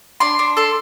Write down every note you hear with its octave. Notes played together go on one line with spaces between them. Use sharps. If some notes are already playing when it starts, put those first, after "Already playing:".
D4 C6
D4
A4 C6